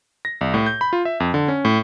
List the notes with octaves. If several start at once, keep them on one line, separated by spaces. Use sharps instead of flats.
A#6
C2
A2
G6
B5
F4
E5
F2
D3
C#4
A2